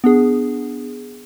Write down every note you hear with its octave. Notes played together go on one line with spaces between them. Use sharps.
B3 D4 G#4